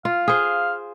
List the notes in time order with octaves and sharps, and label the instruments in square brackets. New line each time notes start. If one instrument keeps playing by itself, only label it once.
[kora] F4 [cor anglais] F5
[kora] G#4 C5